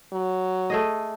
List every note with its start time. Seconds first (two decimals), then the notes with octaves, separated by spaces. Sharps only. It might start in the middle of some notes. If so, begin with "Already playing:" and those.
0.13 F#3
0.70 A3 G#4 D#5